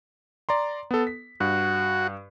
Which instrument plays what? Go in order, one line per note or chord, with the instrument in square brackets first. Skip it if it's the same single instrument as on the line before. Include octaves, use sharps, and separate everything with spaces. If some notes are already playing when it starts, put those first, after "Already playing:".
[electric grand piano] D5 A#5 C6
B3 A4
B6
[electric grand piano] G2 [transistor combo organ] F#4